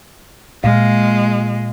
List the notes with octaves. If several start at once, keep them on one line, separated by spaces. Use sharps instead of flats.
A#2 G#3 F5